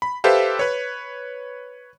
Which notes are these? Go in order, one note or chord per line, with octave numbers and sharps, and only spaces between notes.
B5
G4 A4 B4 C5 E5 F5
B4 C#5